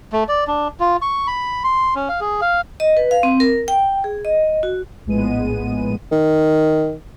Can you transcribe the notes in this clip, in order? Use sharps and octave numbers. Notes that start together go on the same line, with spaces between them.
A3
D5
D4
F4
C#6
B5
C6
C#4
F5
G#4
F5
D#5
B4
F5
C4
A#4
G5
G#4
D#5
F#4
A#1 A2 G#3 B3 D#7
D#3